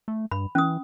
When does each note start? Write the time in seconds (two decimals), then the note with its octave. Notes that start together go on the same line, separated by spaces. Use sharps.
0.08 A3
0.31 G2 B5
0.55 E3 C#4 D#6